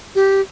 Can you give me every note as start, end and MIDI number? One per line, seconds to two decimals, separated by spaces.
0.15 0.41 67